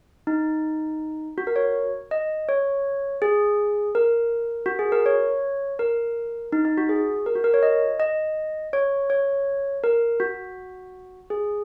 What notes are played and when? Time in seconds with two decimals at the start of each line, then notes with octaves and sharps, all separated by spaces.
0.27 D#4
1.38 F#4
1.47 A#4
1.56 C#5
2.11 D#5
2.49 C#5
3.22 G#4
3.95 A#4
4.66 F#4
4.79 G#4
4.92 A#4
5.06 C#5
5.79 A#4
6.52 D#4
6.65 D#4
6.78 F#4
6.89 G#4
7.26 A#4
7.35 F#4
7.44 A#4
7.54 C#5
7.63 D#5
8.00 D#5
8.73 C#5
9.10 C#5
9.84 A#4
10.20 F#4
11.30 G#4